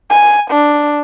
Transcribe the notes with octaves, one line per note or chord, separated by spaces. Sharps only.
G#5
D4